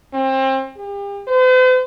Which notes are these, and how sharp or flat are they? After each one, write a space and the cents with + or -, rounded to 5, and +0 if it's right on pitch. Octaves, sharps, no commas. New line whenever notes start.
C4 +30
G4 +40
C5 -45